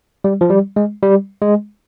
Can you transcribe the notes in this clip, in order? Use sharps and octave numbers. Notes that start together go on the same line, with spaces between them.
G3
F3
G3
G#3
G3
G#3